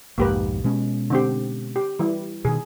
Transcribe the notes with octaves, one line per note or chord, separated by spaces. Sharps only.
B1 F2 G#2 A#3 G4 B4
B2 G#3 C#4
D3 C4 G4
G4
E3 G3
B2 D#3 G#4